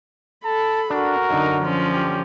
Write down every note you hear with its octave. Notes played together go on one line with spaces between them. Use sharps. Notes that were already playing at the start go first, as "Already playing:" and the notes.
A4 A5 B5
D4 F#4 A#4
F#2 D3 D#4
F3 C#4
G4